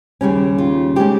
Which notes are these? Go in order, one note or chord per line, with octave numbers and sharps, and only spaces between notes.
D#2 C#3 G3 C#4
F4
C#3 G#3 C#4 G4